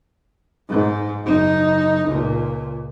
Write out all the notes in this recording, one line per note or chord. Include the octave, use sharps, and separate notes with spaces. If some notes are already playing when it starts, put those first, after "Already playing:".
G#2
F#1 D#4
C#2 A#2